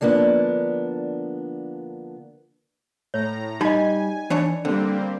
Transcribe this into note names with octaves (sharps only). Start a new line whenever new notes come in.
D3 F3 A#3 B3 D4
A2 C#5 A#5
G3 D#4 D#5 G#5 B5
E3 D4 C#5
D3 G3 A#3 C4